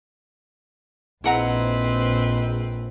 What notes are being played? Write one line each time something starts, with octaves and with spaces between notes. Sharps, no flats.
A#1 C4 E4 G#4 B4 D#5 F#5 A#5